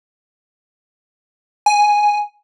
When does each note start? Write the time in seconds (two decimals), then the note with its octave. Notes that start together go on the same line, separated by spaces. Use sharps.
1.66 G#5